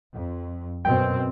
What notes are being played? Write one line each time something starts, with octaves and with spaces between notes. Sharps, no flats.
F2
F#2 B2 C4 G5